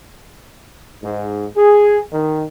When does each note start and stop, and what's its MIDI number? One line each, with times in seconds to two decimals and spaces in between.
1.03 1.47 44
1.57 2.01 68
2.13 2.45 51